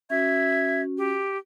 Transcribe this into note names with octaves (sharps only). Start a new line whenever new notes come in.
C#4 F#4 E5 G#6
G4